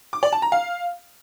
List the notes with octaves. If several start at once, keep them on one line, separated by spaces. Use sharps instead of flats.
D6
D5
A5
A#5
F5